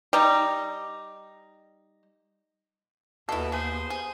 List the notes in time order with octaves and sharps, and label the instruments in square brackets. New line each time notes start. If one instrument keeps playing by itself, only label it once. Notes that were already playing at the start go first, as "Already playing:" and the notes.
[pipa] G3 D#4
[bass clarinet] D#2 [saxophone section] B2 [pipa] E4 A4
[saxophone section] B3 C5 [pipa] G#4
[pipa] G#4